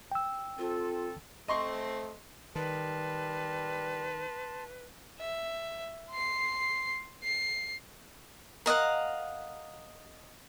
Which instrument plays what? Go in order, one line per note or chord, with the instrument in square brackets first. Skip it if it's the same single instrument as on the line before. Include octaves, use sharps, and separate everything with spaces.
[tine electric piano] G5 E6
[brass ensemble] C4 A4 [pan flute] F4
[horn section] A3 C4 [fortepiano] D#5 C6 C#6
[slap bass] D#3 [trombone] G3 [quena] B4 [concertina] A5 C6
[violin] E5
C6 C7
C7
[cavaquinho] A#4 D#5 F5 F#5